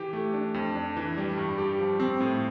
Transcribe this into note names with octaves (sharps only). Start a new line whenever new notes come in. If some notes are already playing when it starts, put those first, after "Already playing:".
Already playing: E3 G4
A3
D4
F2
D4
E3
G3
G2
G4
F3
C4
A2